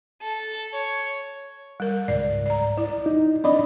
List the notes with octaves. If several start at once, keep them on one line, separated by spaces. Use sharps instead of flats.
A4
C#5
G3 A#4
C#2 G#2 D5
D5 A#5
E4 D5
D#4
C4 D4 D5 D#5 B5